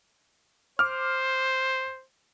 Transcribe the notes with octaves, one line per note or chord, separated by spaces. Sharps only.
C5 D6 F6